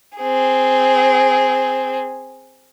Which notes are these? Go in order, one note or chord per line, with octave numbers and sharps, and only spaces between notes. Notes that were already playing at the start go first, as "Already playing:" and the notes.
C4 G#4